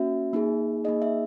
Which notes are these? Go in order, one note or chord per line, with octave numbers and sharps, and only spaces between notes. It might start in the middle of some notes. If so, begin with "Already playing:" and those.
Already playing: A#3 C#4 F#4 E5
A#3 D#4 G#4
A#3 D#4 G#4 D#5
E5